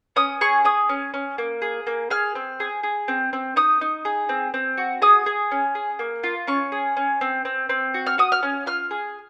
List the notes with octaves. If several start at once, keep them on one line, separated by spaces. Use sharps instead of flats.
C#4 D#6
G#4 C#6
G#4 D#6
C#4
C#4
A#3
G#4
A#3
G#4 F6
C4
G#4
G#4
C4
C4
D#4 D#6
D#4
G#4
C4
C4
F#4
G#4 D#6
G#4
C#4
G#4
A#3
F4
C#4 C#6
G#4
C#4
C4
C4
C4
F#4
F6
F#4 D#6
F6
C#4
F4 F6
G#4